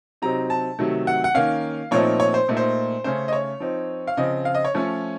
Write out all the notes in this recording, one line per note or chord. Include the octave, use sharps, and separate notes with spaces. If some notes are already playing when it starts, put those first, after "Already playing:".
C3 F#3 C4 D#4 A#5
A5
C3 D#3 F#3 A3
F#5
F#5
D#3 A#3 C#4 F5
A#2 F3 A3 C4 D#4 C#5
C#5
C5
A#2 A3 D#4
C5
C#3 A3 C#4 C5
D#5
C#5
F3 C4 D#4
F5
C#3 F3 C4 D#5
F5
D#5
C#5
F3 A3 C#4